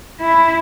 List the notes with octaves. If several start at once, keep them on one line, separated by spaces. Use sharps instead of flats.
E4